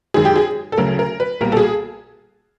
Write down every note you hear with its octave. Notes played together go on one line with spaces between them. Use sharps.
F#2 D#3 G#3 G#4
G4
G#4
A4
D2 C#3 F#3 A3 A#4
A#4
B4
B1 A#2 G3 A#4
A4
G#4